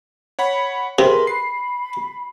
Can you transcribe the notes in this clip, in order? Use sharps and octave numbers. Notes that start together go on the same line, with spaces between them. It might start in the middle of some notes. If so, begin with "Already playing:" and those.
C#5 F#5 B5
C3 G#4 A#4 B4 C6
B5 C7